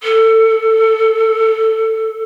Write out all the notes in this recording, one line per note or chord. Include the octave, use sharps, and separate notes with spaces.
A4